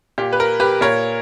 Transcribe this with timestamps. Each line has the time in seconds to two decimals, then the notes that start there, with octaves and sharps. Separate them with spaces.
0.18 A#2 G4
0.32 B4
0.40 A#4
0.60 G4 B4
0.81 A#2 A#4 C#5